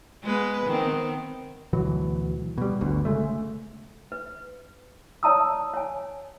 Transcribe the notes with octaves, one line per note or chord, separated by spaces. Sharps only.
G#3 B3 B4
D#3 B3 C4
D2 B2 E3 F#3
B2 G3
G1 D2 B2
C#3 G#3 A3
B4
C#5 D5 A5 A#5 D#6 E6
C#5 G#5